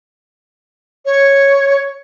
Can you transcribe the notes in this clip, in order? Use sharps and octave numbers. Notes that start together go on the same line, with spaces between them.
C#5